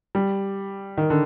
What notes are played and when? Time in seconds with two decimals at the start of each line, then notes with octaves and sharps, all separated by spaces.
0.15 G3
0.97 D#3
1.10 D3